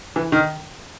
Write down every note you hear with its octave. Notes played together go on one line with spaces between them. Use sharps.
E3
D#3